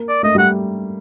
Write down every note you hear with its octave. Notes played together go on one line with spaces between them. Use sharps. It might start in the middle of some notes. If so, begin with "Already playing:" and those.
Already playing: A#3
D5
A3 D#5
G3
F#5